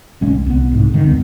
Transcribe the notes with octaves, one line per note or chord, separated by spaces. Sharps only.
F#1 B1 G#3 C#4
C2
C2 B3
C2 G#2
G1 C#2 D3 D#3
E1 G2 B3